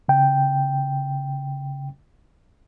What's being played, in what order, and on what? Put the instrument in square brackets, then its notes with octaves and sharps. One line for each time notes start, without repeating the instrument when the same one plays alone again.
[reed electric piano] C#3 G5